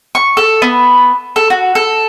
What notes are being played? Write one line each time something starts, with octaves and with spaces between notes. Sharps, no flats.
C#6
A4
B3
A4
F#4
A4